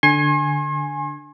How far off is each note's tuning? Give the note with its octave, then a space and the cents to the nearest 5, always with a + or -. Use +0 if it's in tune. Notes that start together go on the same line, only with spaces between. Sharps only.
D3 +0 G#5 +0 C6 +45